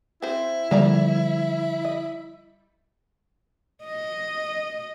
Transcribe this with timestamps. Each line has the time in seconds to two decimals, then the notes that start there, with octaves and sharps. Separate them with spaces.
0.22 C4 E4 C5
0.71 D3 F3 G3 A#3 D5 A#5
1.85 D#5
3.85 D#5